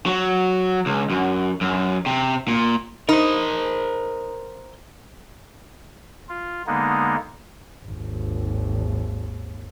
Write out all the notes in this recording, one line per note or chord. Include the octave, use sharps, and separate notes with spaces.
F#3
C#2
F#2
F#2
C3
A#2
D#4 A#4 C5
F4
D3 G#3 A#3 B3 D#4
G#1 D#2